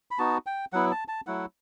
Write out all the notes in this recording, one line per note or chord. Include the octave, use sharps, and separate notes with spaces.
B5
B3 D#4 F#4 A5
G5
F#3 B3 E4 F#5
A5
A5
F#3 A3 E4 F#5